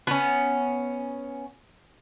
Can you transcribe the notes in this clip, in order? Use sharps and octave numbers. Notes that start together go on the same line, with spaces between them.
B3 C#4